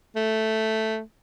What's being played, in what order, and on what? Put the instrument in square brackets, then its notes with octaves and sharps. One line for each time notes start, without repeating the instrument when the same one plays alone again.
[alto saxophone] A3